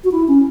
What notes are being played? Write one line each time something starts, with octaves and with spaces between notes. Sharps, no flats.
F#4
E4
C#4